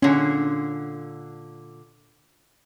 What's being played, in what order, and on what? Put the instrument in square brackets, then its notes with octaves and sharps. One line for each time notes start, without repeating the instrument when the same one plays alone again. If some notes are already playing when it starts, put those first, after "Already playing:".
[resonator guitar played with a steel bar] A#2 D3 [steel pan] C#4